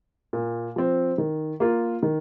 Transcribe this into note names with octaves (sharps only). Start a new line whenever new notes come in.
A#2
F3 C4
D#3
A#3 F4
D#3